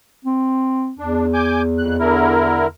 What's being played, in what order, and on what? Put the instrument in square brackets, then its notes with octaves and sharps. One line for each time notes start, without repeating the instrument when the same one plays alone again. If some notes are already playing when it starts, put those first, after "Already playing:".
[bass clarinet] C4
[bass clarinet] E2 [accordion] D4
[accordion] G#5 D6 G6
F2 F#6
D3 E4 A#4